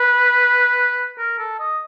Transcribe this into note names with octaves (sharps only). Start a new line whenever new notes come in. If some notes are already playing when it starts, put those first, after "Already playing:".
Already playing: B4
A#4
A4
D#5